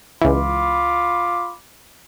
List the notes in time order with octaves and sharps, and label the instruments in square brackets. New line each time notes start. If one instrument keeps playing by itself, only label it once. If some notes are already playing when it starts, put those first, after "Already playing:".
[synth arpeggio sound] C#2 E3 [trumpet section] F4 B5 D6